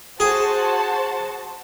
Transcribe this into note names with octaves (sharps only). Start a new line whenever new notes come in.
F#4 G#4 C5 A5